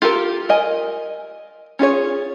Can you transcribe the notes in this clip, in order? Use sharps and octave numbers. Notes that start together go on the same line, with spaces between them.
F4 G4 A4 A#4
A#4 D#5 G#5
C#4 F4 G#4 C#5